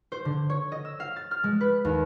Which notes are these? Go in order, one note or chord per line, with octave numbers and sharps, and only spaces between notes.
C5
D3
C#5
D#5
E6
F5
A6
F6
G#3
B4
D#2